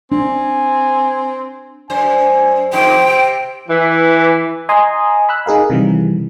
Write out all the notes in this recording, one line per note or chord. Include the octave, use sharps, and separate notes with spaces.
C4 D4 G#5
F#2 C5 G#5
F2 G#2 D#3 C5 G5
C3
E3
D#5 G#5 A#5 C6 D#6
B5 E6 F#6
D#4 G#4 A#4 F5
C3 D#3 E3 G3